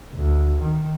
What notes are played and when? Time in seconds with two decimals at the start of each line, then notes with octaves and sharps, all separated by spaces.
0.15 D2
0.62 D#3